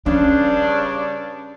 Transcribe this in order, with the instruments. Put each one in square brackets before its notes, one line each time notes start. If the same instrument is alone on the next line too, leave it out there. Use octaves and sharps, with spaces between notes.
[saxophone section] G2 C#3 D4 [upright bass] C#4